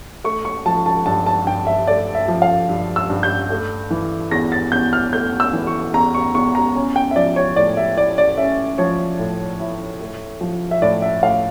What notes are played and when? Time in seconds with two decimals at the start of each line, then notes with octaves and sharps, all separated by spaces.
0.24 A3 C#6
0.45 C#6
0.66 F3 A5
0.86 A5
1.06 G2 A5
1.26 A5
1.47 G2 G5
1.67 E5
1.87 A3 D5
2.15 E5
2.28 F3
2.42 F5
2.69 G2
2.96 E6
3.10 G2
3.23 G6
3.50 A3
3.91 E3
4.31 E2 A#6
4.52 A6
4.72 E2 G6
4.93 F6
5.13 A3 G6
5.40 E6
5.53 E3
5.67 C#6
5.94 E2 A#5
6.14 C#6
6.35 E2 C#6
6.55 A#5
6.76 C#4
6.96 G5
7.11 E5
7.16 F3 D5
7.36 C#5
7.56 A2 D5
7.77 E5
7.97 E4 D5
8.18 D5
8.38 C#4 E5
8.78 F3 C#5
9.19 A2
9.60 E4
10.00 A3
10.41 F3
10.71 E5
10.82 A2 D5
11.02 E5
11.23 A2 F5